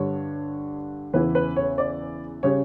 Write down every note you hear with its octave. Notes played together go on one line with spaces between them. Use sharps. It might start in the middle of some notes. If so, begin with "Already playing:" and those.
Already playing: G2 D3 G3 D4 C#5
E2 C#3 E3 B3 E4 B4
B4
C#5
D5
C#3 G3 C#5